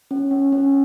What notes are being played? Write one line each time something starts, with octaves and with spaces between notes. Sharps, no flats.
C#4
C#4
C#4